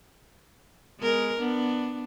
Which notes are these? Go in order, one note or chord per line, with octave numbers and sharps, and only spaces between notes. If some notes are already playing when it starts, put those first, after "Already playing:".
G#3 B3 A#4
B3 D4